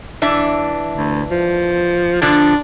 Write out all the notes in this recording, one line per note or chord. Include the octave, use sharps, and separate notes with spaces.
E3 D4 E5
D2
F3
D3 F3 D4